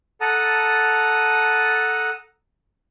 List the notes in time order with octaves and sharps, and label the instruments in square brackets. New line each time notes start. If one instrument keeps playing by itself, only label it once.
[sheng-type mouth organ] A4 F#5 A5 A#5 D#6